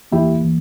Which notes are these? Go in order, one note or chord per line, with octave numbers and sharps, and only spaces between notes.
E2 E3 A#3 E4 G4
E3